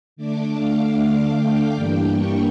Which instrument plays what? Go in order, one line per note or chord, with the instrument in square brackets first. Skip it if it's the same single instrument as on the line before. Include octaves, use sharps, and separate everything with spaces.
[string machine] D3 A3 D4 D6
F5
G5
G2 E3 G3 A#3 D4
C#6